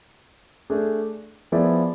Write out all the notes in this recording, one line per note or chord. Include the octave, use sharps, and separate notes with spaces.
A3 D4 G#4
F3 B3 E4 G#4 D5